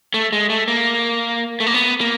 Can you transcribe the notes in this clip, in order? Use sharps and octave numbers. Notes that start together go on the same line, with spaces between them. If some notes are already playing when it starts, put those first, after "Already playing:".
A3
G#3
A3
A#3
A3
A#3
B3
A#3